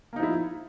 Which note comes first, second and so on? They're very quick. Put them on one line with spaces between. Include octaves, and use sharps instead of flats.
A#3 D#4 F3 E4